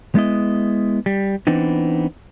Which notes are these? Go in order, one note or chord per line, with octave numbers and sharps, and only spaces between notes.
G#3 B3 E4 D#5
G3
E3 B3 C4 D4 D#4